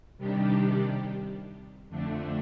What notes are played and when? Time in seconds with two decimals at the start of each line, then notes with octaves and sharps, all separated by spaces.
0.18 C3 D#3 G3 D4 G4
1.89 F2 D3 A3 D4